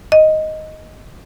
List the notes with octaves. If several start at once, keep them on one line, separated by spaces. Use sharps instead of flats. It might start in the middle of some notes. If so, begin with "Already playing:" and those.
D#5